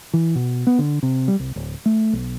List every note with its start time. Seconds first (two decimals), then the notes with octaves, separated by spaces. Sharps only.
0.14 E3
0.35 B2
0.67 B3
0.79 D3
1.03 C3
1.28 G3
1.40 C2
1.56 D1
1.86 A3
2.13 B1